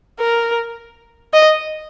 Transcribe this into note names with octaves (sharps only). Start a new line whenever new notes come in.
A#4
D#5